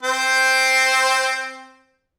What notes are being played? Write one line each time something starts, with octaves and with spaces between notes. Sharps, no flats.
C4 C5